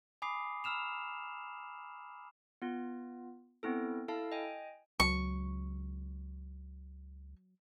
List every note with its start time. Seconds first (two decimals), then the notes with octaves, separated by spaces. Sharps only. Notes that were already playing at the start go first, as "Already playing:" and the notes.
0.22 G#5 B5 D6 D#6 C7
0.64 A#5 B5 E6 F6 E7 F7
2.62 B3 F4
3.63 B3 C4 E4 A4
4.08 E4 A4 F5 A5
4.32 D#5 G5 G#5
5.00 C#2 F#3 C#6